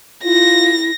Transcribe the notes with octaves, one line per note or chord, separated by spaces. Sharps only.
E4 F4 A#6